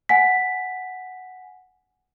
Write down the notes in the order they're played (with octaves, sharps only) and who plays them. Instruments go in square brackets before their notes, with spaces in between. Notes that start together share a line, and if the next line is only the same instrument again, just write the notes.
[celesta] F#5 G#5 B6